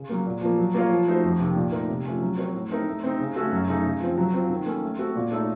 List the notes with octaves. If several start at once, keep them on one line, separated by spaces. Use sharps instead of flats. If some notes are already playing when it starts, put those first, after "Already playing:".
Already playing: C#3
F#3 A#3
A#2
F3 A#3
F#3
A#3 F4 A#4 C#5
F3
A3 D#4 F#4 C5
F2
C3 D#3
A#2
A3 D#4 A#4
C3
F3 A3 C#4
F#3
C4 F#4 A#4 C#5
A2
A3 C4 D#4 A#4
A3
C4 D#4
C#3
A3 C#4 F#4 A4
F#2
C#3 A3 D#4
C#3
F3 C4
F#3
C4 F4
D#3
A#3 C#4 A4
A3
C4 F#4 A4
A#2
A3 D#4 A4 C#5